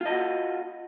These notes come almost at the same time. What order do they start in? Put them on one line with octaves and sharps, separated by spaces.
F4 D#5 F#4